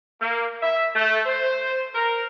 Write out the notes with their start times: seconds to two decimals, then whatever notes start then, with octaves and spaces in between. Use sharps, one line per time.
0.22 A#3
0.63 E5
0.95 A3
1.26 C5
1.95 A#4